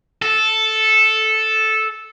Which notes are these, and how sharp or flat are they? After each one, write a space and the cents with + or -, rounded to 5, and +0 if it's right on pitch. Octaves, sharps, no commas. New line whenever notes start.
A4 -5